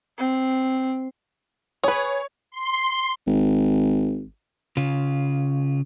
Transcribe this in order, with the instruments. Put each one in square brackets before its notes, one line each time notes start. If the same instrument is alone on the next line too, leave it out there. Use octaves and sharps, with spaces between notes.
[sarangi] C4
[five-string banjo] G#4 B4 [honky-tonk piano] C#5
[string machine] C6
[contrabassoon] G#1
[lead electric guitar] C#3 F4